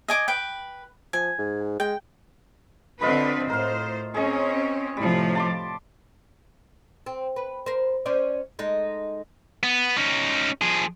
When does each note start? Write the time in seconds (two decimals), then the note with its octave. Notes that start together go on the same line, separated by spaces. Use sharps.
0.08 D#5 G#5 D6
0.28 B4 G5
1.13 F3 G#5
1.38 G#2
1.80 G#3 G5
3.01 D3 C4 F4 B4 D#5 B5
3.50 A2 A#4 C5 F5
4.14 C4 C#4 G#4 D#5
4.97 A2 C3 F3 G3
5.35 A5 C6 D6
7.06 C4
7.36 B4
7.66 A#4 C5
8.06 C#4 C5 D5
8.59 G#3 D#4 A4
9.63 B3
9.97 C#4 D#4
10.61 F3 G#4